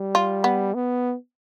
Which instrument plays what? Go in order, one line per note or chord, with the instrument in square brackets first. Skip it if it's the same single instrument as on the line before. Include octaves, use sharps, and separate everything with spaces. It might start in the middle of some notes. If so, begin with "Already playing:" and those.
Already playing: [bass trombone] G3
[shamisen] F4
B3
[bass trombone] B3